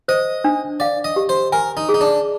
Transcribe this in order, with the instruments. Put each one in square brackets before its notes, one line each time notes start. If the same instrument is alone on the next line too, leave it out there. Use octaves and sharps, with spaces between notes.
[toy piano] C5 [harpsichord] D#5
[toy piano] D4
[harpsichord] D5 [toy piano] F5
[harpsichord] D#5
[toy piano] G4
[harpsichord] C5
[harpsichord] A#4 [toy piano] G#5
[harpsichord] D#4
[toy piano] G#4
[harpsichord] D#4
D4